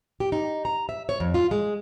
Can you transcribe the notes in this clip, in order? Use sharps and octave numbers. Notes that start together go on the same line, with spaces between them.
G4
D#4
A#5
E5
C#5
F2
F4
G#3